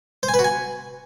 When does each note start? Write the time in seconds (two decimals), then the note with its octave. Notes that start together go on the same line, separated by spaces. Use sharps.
0.23 C5
0.28 G#5
0.34 B4
0.39 F#4
0.44 G#5